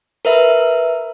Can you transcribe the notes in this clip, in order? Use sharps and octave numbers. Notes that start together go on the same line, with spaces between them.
A#4 B4 E5